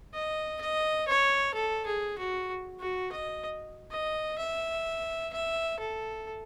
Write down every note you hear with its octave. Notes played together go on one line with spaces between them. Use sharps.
D#5
D#5
C#5
A4
G#4
F#4
F#4
D#5
D#5
E5
E5
A4